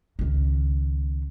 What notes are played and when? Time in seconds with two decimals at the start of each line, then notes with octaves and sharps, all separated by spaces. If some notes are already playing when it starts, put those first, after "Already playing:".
0.19 C#2 D#3